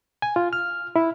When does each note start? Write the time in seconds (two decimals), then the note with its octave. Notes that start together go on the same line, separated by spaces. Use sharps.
0.22 G#5
0.36 F4
0.53 F6
0.96 E4